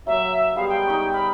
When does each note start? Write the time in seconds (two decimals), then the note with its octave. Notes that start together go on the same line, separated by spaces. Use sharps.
0.07 F#3 A#3 E5
0.56 G3 G#3 B3 F5
0.69 G5
0.87 D#4 E5 C#6
1.13 D#5 F5 B5